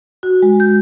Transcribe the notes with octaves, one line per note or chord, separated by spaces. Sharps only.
F#4
G#3
G6